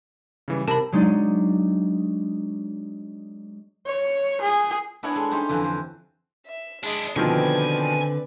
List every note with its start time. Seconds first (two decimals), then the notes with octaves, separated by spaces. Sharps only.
0.48 C#3 E3 G3
0.68 C3 A#4 A5 B5
0.92 F#3 G#3 D4 D#4 D5
3.86 C#5
4.41 G#4
5.03 B3 D4 E4 A#4 C#5 G#5
5.15 G#3 A4
5.31 C#4 D#4 G4 C5
5.49 F2 D3 E3
5.64 C5
6.46 E5
6.83 G#3 D4 E4 D#5
7.16 B2 D3 D#3 F3 C4 B4 D5 G#5